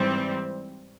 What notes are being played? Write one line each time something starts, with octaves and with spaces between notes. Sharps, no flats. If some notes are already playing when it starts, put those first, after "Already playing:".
Already playing: G#2 E3 G3 C4